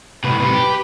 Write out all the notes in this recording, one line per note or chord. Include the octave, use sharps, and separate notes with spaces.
C2 A2 B4
C3 G3 B4
G4